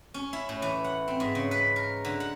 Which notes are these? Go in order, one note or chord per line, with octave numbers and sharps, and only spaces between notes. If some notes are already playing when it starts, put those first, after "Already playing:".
C#4
E4
A2
E3
F#5
C4
G#2
C#3
B4
A#4
D3
F#5